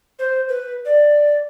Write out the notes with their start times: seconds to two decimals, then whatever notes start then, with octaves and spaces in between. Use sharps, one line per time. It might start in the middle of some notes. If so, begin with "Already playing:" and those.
0.19 C5
0.48 B4
0.85 D5